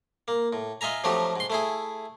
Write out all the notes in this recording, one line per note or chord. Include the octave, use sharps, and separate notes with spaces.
A#3
A2
F4 D#5 E5 G#5 A#5
F3 F#3 A3 C4 D#4 G4
G#2 C6
A3 E4 G#4